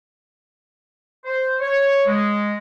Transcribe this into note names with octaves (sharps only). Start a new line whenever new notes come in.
C5
C#5
G#3